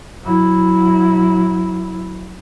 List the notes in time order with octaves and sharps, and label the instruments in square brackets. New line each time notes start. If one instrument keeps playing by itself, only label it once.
[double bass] F#3 E4